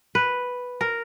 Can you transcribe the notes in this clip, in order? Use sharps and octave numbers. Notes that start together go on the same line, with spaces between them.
B4
A#4